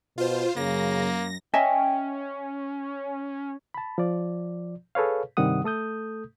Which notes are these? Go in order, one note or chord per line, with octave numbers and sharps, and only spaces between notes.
B2 F4 C5
F#2 C#3 A#3 A#6
C#4 D#5 E5 G5 G#5
A5 B5
F3 D5
G#4 A4 B4 C#5 F5
G2 C3 D#3 G3 F#5 D#6
A3 A4 D#6 G6